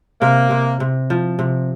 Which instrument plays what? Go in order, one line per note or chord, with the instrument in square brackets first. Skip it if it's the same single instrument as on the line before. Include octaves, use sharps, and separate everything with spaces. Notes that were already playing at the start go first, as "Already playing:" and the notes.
[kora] C3 [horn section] A#3
[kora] C3
C3
F3
C3